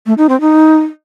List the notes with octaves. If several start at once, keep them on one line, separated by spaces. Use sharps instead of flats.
A3
D#4
C4
D#4